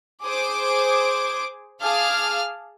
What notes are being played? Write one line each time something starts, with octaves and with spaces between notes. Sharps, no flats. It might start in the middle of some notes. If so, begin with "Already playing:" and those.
G#4 C5 D6 D7
G#4 F5 A5 D6 F6